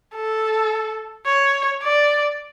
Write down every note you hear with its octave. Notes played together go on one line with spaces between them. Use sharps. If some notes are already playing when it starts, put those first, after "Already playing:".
A4
C#5
D5